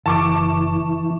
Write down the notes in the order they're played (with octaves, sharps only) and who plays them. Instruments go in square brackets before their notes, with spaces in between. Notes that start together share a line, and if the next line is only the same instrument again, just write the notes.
[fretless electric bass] F#1 [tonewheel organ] E3 [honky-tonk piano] A5 C#6 D6